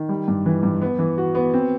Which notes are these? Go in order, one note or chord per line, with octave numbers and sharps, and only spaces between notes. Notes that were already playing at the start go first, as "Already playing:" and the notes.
Already playing: D#3
G3
G2
E3
G2
B3
E3
F#4
B3
C4